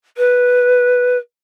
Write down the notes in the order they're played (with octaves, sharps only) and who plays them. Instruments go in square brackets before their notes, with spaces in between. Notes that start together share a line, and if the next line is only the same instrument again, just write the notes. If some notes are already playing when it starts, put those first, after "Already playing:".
[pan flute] B4